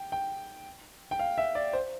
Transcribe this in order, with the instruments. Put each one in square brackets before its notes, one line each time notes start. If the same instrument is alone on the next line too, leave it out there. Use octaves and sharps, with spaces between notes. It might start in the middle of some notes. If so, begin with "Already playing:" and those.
Already playing: [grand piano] G5
G5
G5
F5
E5
D5
C5